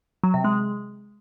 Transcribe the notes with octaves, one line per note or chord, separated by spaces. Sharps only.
F#3
C3
G#3